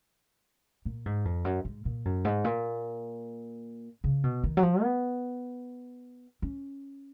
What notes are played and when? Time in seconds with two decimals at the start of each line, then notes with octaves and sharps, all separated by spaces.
0.85 A#2
1.06 G#2
1.25 F2
1.45 F#2
1.65 G#2
1.85 A#2
2.05 F#2
2.25 G#2
2.44 A#2
4.04 C#3
4.24 B2
4.44 D#3
4.57 F#3
4.63 F3
4.82 B3
6.42 C#4